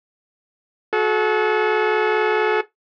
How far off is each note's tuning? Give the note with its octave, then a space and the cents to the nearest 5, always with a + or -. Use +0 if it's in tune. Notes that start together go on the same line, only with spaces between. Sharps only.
F#4 -20 A4 -35